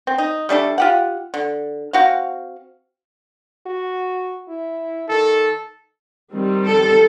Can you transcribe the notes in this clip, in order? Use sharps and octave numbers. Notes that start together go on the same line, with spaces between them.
C4
D#4
G3 A3 D4 A4
F4 G4 F#5
D3
C4 F#4 F5
F#4
E4
D#3 A4
D#3 G3 C4
A4